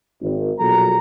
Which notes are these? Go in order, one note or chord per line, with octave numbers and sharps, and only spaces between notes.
G#1
A#1 B2 F#3 F4 A4 A#5